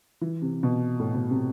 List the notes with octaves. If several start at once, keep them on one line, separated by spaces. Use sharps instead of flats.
E3
C3
B2
A2
B2
C3